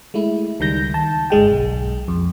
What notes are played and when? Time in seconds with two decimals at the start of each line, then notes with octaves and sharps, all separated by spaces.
0.14 G#3 A3 E4
0.60 C#2 D#3 G3 G6 A#6
0.94 A5
1.30 G1 G#2 G#3 G5
1.52 B1
2.08 F2